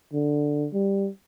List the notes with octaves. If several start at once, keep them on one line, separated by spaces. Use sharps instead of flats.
D3
G3